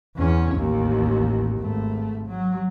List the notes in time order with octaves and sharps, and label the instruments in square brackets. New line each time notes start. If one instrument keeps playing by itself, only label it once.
[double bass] E2 C#4
A1 D#2
G#1 A3
F#3